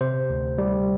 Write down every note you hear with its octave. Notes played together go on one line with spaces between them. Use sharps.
C3 C5
D2
G3